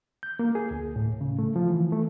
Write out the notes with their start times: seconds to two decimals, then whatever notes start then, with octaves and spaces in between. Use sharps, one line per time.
0.23 G6
0.39 A#3
0.55 G#4
0.71 D2
0.96 A2
1.21 C#3
1.39 A3
1.56 F3
1.70 E3
1.92 A3